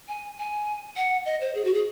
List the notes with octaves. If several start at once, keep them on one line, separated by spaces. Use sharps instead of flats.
G#5
G#5
F#5
D#5
C5
G#4
F#4
G#4